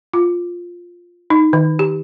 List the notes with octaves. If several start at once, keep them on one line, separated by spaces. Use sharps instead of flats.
F4
D#4
D#3
G4